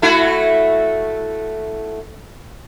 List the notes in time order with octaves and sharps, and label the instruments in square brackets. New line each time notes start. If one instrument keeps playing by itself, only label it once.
[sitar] A3 E4 F#4